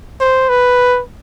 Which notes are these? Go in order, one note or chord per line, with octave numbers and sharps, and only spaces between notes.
C5
B4